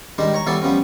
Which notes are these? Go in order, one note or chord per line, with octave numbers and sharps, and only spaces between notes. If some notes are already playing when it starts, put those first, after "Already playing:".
D#3 G3 G#3 D4
C#5 A#5
E3 G3 B3 A4 C#5 D5
F3 G3 B3 C#4